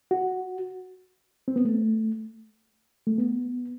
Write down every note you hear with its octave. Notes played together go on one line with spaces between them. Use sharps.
F#4
C4
B3
A3
A3
B3